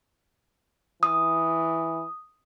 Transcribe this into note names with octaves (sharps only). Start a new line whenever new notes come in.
E3 D#6